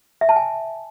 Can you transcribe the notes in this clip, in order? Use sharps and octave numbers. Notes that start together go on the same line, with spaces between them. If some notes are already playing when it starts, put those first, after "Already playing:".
E5
A5
G#5